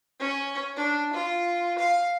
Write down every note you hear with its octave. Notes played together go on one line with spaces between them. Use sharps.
C#4
D4
F4
F5